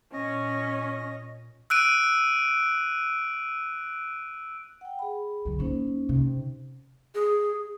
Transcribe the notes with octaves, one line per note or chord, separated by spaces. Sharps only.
A#2 C#4 D#5
E6 F#6 D7 D#7
F#5 G5
G#4 B5
D3 F#3
D#2 A#3 C#4 D#4 C5
C3
G#4